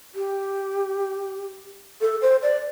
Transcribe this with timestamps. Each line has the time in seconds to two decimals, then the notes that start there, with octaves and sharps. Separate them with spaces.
0.15 G4
2.01 A4
2.22 C5
2.42 D5